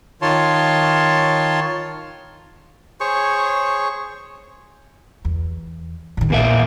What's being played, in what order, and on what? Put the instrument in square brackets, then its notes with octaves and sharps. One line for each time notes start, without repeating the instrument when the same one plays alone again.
[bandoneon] D#3 F4 C#5 A5 C6
[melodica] G#4 C5 C#5 C#6
[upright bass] E2
A2 D#3
[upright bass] A#1 [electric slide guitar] E2 A#3 E5